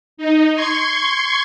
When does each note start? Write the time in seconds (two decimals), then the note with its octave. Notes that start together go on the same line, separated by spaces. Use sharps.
0.17 D#4
0.54 C6 C#6 G#6